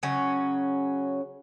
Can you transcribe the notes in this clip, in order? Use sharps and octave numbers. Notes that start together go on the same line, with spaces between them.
C#3 F#3 C#4